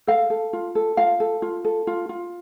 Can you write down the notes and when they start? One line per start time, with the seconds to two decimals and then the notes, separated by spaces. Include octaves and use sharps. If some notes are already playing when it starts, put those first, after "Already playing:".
0.07 A4 F5
0.30 A4
0.53 F4
0.75 A4
0.97 F4 F5
1.20 A4
1.42 F4
1.65 A4
1.87 F4
2.09 F4